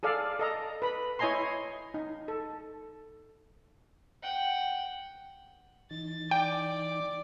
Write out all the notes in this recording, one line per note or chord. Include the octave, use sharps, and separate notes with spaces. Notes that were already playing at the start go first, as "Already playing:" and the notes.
G#4 A4 D5 F5
A4 D#5 A#5
B4 B5
E4 C#5 D#5 G#5 A#5 C6
D#4
A4
F#5 G5
E3 D#4 A6
D5 G5 D6